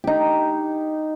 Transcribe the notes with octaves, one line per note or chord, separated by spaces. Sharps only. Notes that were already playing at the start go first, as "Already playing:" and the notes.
D#4 G4